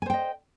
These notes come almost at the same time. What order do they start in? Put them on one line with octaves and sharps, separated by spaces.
G#5 C5 G5 D#5